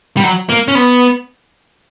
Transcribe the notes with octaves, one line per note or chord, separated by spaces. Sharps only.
G3
F#3
A#3
C#4
B3